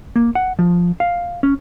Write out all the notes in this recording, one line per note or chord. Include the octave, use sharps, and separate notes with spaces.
A#3
F#5
F3
F5
C#4